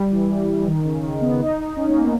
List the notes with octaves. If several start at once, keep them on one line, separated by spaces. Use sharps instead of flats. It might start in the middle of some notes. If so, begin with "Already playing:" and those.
Already playing: G3
E3
E3
D#3
C#3
D#3
B3
D#4
C#4
A#3
B3